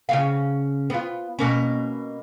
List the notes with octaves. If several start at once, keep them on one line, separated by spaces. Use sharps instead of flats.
C#3 C#4 F5
B3 F4
B2 A#3 C#4